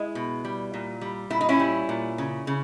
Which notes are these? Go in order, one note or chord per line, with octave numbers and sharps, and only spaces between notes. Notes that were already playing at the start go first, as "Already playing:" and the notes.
Already playing: G#3 E4
B2
G3
A#2
G3
A#2 E4
D#4
C#4 E4
G3
A#2
C#3
C#3